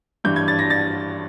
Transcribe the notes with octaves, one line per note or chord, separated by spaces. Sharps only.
G2 E3 G3 G6
G#6
A6
A#6
A6